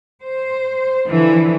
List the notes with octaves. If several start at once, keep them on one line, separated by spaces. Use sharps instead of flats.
C5
D3 E3 F3